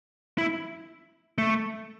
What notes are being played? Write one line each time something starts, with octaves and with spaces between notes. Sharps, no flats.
E4
A3